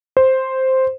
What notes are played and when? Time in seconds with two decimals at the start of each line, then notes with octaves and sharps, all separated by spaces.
0.17 C5